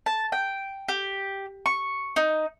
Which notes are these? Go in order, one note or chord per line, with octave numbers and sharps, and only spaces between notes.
A5
G5
G4
C#6
D#4